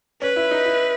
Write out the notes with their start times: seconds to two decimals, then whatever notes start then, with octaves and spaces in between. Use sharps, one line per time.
0.21 C#4 B4
0.36 E4
0.51 D#4
0.66 E4